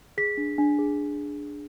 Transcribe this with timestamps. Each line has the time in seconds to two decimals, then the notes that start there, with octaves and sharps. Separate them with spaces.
0.18 G#4 B6
0.37 D4
0.58 D4
0.79 G#4